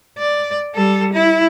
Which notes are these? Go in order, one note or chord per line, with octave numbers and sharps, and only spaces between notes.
D5
G3 A4
E4